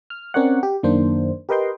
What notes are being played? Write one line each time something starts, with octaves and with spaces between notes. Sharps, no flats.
F6
C4 C#4 A#4 C#5 D5 F#5
G4
F#2 D#3 A#3 D4 C5
G4 A#4 B4 D#5 G5 C6